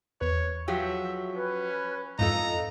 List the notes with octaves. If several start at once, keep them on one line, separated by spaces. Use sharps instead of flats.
E2 B4 C#5 F#6
F3 F#3 G4 G#4 E5 G6
C#4 B4
F2 G#2 D#4 F4 A4 D#5 A#5